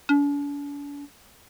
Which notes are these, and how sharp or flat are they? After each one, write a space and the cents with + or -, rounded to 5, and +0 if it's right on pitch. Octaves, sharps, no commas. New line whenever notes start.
D4 -45